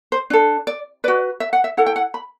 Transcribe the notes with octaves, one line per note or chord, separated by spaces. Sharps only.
C5
D4 A4
D5
F#4 B4 D5
E5
F#5
E5
E4 A4 F#5
G5
F#5
B5